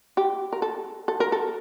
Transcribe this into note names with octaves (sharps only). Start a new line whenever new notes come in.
G4
A#4
A4
A4
A#4
A4